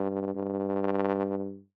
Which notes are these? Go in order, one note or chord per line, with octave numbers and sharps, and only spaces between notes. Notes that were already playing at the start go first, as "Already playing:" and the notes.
Already playing: G2
G2